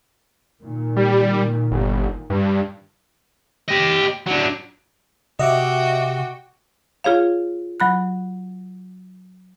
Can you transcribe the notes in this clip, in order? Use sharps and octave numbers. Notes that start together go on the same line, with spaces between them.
A#2 D#3
G3
G1
G2
G4 D#5
F#3 D4
C3 F#4 D#5 E5 G5 D6
F4 G#4 C#5 F5
F#3 B5 F#6